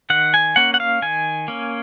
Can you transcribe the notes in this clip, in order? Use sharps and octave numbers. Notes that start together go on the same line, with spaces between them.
D#3 F#5
G#5
A#3 C#4 F#5
F#5
F5
D#3 G#5
A#3 C#4